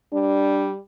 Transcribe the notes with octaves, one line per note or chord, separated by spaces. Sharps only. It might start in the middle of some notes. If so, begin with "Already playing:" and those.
G3 D4